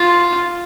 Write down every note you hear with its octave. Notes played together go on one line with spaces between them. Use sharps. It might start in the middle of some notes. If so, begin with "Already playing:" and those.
Already playing: F4